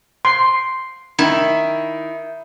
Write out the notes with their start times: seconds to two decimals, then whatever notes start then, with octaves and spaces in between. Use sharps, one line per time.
0.25 C6
1.19 D#3 E4